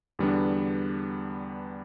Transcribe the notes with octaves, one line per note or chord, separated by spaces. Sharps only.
E2 D3 G3 B3 D4